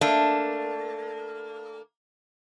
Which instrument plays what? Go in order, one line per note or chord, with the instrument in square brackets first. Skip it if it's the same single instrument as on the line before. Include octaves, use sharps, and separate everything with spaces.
[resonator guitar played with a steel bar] A3 A#3 D4